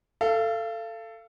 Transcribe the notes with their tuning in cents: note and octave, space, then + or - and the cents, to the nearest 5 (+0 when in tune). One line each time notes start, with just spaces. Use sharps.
A4 +10 F5 -35